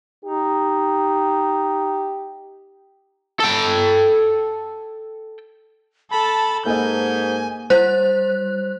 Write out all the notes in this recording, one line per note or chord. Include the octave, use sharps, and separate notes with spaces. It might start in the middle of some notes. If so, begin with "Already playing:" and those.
D#4 G4
A4 G5
A4 A5 B5
G#2 A#3 A4 D#5 G#5 G6
G3 C5 F#6